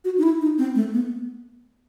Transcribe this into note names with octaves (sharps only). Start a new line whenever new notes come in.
F#4
D#4
E4
D#4
C4
A3
B3